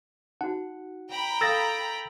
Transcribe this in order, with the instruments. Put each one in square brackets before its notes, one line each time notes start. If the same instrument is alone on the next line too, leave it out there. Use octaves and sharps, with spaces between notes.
[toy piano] D#4 F#4 [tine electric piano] F#5
[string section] G5 A#5 B5
[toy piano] A4 F5 [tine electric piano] E6 A6 A#6